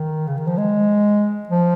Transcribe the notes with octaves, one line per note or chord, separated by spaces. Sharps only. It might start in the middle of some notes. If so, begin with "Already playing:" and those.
Already playing: D#3
C#3
D#3
F3
G#3
F3